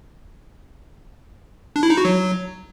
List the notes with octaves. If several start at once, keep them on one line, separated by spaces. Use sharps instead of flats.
D4
E4
D#4
F#4
F#3